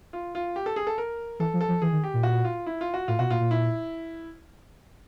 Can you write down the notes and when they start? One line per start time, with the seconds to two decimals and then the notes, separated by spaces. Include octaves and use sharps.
0.13 F4
0.35 F4
0.56 G4
0.66 A4
0.76 G#4
0.87 A4
0.98 A#4
1.39 E3 A4
1.54 F3
1.61 A4
1.68 F3
1.82 E3 G#4
1.92 D#3
2.04 G4
2.14 A#2
2.23 F#4
2.44 F4
2.66 E4
2.81 F4
2.94 F#4
3.08 A2 F4
3.19 B2 F#4
3.30 A#2 F4
3.40 A#2
3.51 E4